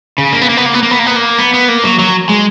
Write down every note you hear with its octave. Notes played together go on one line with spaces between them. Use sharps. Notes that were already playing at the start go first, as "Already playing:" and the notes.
C#3
A#3
B3
A#3
B3
A#3
B3
A#3
B3
A#3
B3
A#3
B3
B3
A#3
F#3
F#3
G#3